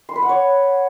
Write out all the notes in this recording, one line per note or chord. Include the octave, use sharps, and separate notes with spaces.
C6
B4
F#5
C#5